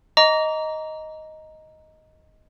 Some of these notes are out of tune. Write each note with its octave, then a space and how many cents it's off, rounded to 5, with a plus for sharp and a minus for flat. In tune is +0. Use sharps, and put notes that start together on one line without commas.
D#5 +5 A#5 +0 D6 -35